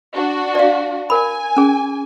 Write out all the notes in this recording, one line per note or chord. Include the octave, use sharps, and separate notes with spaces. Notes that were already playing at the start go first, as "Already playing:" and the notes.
D4 F#4
D5 F5
A#4 G#5 B5
C#4 G#4